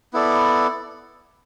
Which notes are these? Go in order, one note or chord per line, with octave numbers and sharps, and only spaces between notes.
B3 E4 A4 D5